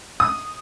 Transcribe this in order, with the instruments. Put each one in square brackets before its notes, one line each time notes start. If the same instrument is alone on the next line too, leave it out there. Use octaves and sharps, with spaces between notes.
[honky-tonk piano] D#6